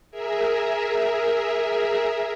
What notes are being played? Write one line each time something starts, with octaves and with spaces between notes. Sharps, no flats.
G#4 A#4 E5